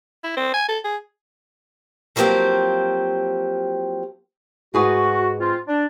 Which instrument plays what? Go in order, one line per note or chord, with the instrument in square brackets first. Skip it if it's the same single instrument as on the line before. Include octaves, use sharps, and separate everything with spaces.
[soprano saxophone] E4
C4
G#5
A4
G#4
[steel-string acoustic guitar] F3 F#3 A#3 C4 G4 C5
[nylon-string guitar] G#2 G#4 B4 [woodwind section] F#4
[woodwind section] C4 F4
D4